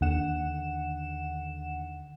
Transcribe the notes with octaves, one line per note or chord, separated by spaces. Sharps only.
D#2 D3 F#5 E7